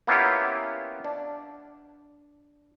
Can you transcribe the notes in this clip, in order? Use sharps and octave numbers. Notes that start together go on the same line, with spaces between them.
A#3 B3 C#4 E4 F4 G4
D4